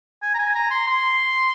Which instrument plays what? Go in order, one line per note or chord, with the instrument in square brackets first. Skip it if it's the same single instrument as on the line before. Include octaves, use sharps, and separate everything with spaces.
[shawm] G#5
A#5
G#5
A#5
C6
C6